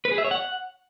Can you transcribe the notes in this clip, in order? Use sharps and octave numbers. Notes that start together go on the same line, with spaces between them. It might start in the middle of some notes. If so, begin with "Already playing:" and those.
B4
G#4
E5
C#5
F#5